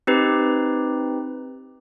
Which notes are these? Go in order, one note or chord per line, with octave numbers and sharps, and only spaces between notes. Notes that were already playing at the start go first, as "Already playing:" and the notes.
C4 D#4 G4 B4